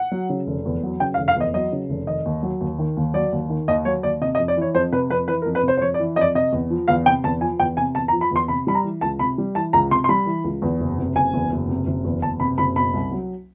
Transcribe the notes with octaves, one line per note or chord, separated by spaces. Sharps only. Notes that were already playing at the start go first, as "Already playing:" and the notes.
Already playing: F#5
F#3
C#3
F1
E2
F#3
C#3 G5
F5
F1
F5
E2 D#5
F#3 D#5
C#3
F1
D#3 D#5
D#2
F#3
D#2
D#3
D#2
F#3 D5
D#2
D#3
D#2 D#5
F#3 C#5
D#2 D5
C3 D#5
D#5
F2
D5
E3
C#5
F2 C5
C3 B4
F2 B4
E3 B4
A#4
F2
B4
C3 C5
C5
F2 C#5
D5
E3
F2 D5 D#5
C3 D#5
E2
F3
E2 F5
C3 G5
E2 A5
F3 G#5
E2 G5
C3 G#5
E2 A5
A#5
F3
B5
E2 C6
C3 B5
G3 B5
A#5
E3
C#2 A5
C3 B5
G3
E3 A5
C#2 A#5
C3 C6
C6
G3 B5
E3
C#2
E2
F#1
C3
F#1 G#5
E2
F#1
C3
F#1
E2
F#1 A5
C3 B5
F#1 B5
B2 B5
C2
F#3